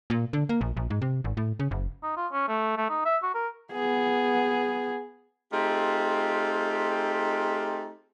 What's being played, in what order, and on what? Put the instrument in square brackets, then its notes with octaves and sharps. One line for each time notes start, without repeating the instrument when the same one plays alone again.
[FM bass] A#2
D3
A#3
A#1
A#1
G#2
C3
G#1
A2
C#3
F#1
[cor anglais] D#4
F4
C#4
A3
A3
D#4
E5
F#4
A#4
[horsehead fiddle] B3 G#4
[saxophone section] A3 C4 D#4 F4 G4 G#4